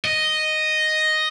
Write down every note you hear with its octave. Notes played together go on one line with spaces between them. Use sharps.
D#5